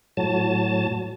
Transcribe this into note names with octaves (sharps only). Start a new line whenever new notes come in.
A2 F#3 A5